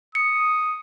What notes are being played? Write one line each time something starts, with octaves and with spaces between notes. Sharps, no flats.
D#6 C#7